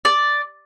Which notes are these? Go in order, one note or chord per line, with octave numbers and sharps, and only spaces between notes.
D5